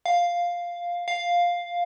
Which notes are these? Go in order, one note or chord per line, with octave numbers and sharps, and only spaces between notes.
F5
F5